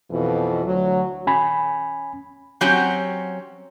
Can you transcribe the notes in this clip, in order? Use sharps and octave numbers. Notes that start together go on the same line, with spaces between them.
F2 B2 E3
D2 F#3
C#4 G#5 B5
F#3 C4 C#4 F#4 G4